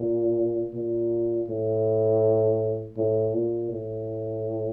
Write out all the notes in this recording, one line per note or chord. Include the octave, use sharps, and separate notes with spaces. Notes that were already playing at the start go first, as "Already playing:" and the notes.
Already playing: A#2
A#2
A2
A2
A#2
A2